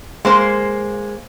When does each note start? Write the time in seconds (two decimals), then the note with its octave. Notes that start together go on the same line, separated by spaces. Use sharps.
0.25 G#3 A#3 C5